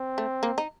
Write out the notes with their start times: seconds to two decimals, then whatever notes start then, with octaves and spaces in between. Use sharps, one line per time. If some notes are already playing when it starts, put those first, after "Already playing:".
Already playing: C4
0.18 A3
0.43 A#3
0.58 D#4